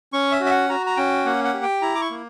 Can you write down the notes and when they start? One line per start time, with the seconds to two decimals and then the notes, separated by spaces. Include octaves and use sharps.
0.13 C#4 C#6
0.32 E5
0.40 F#4
0.46 E5
0.51 F#5
0.70 F#4 A#5
0.86 A#5
0.97 C#4 G5
1.25 A#3 F#5
1.44 F#5
1.54 G4
1.63 G5
1.82 E4 A#5
1.95 D6
2.01 C#6
2.11 A#3